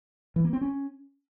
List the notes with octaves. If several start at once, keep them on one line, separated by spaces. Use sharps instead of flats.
E3
A#3
C4
C#4